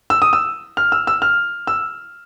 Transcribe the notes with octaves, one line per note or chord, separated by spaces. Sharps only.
E6
D#6
E6
F6
E6
E6
F6
E6